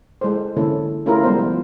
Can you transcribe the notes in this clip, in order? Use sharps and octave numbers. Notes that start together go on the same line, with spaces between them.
G#3 E4 A4 C5
D3 E3 A#3 C#4 E4 A4
A3 C#4 E4 F4 G#4 A#4
G3 G#3 B3 C5
F3